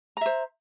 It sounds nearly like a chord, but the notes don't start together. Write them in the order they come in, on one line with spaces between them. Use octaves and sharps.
A#5 E5 C5